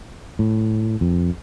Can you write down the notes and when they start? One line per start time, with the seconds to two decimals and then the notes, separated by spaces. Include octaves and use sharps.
0.39 A2
1.01 F2